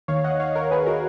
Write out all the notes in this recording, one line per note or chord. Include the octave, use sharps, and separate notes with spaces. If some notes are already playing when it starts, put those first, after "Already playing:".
D#2 D#3 C#5 F5
D#5 F#5
C#5 F5
A#4 C#5
G#4 B4
F#4 A#4